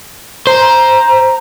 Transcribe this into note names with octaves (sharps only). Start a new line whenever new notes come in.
C5 A#5